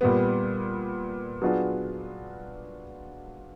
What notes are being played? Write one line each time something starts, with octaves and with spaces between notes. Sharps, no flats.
A#2 G3 B3
F#3 B3 D4 F4 G#4